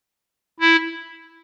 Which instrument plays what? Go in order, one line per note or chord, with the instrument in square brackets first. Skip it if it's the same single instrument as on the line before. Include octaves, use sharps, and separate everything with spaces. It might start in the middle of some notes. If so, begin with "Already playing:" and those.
[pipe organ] E4